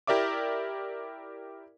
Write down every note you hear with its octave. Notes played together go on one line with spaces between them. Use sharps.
E4 G4 A#4 D5 E5 D6